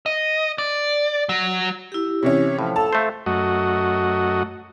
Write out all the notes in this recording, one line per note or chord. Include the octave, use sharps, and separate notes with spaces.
D#5
D5
F#3
E4 G4
C3 E3 C#4 C#5
A2 F3
A4 F5 A5
A3 C5
F#2 A3 F#4 D#5